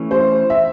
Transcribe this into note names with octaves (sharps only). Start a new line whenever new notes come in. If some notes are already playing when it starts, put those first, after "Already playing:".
Already playing: E3 A3 C#4
C5
E5